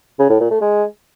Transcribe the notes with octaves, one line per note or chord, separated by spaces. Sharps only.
C#3
A2
A#2
A3
G#3